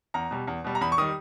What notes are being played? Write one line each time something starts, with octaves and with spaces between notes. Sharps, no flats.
E2 A#5
B2 G3
E2
B2 G3
A#5
E2 B5
C#6
D#3 G3 D#6